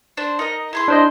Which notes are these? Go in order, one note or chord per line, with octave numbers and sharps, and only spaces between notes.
D4 C5
D#4 A#4 D#5
E4 G#4 C6
D4 C5 D#5